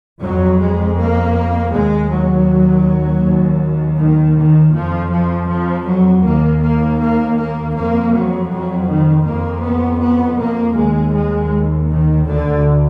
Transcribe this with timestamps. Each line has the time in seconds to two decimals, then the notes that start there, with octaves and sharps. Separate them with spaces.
0.21 F2 F#3
0.60 G#3
0.98 A#3
1.72 D#2 G#3
2.10 F#3
3.23 D#2
3.98 D#3
4.36 D#3
4.74 F2 F3
5.11 F3
5.48 F3
5.86 F#3
6.24 D#2 A#3
6.61 A#3
6.99 A#3
7.37 A#3
7.74 F2 A#3
8.12 F#3
8.50 F#3
8.87 D#3
9.24 F2 A#3
9.63 B3
10.00 B3
10.38 A#3
10.75 D#2 G#3
11.13 G#3
11.88 D#3
12.25 D2 D3